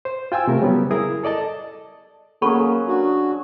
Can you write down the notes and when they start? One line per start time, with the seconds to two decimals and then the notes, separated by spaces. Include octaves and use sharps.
0.05 C5
0.32 F4 G5 G#5 E6
0.47 C3 A3 A#4
0.60 C#3 F#3 G3 B3 C#4
0.91 E4 G#4 A#4 D#6
1.23 A4 D5 D#5 A5
2.42 F#3 A#3 C#4 G#4 A4 B5 C#6
2.88 D4 F#4